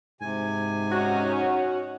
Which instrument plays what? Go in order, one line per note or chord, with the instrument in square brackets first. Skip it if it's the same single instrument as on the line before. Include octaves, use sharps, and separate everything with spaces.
[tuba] G#2 [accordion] C3 G#5
[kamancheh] C#4 D#4 [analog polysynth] F#4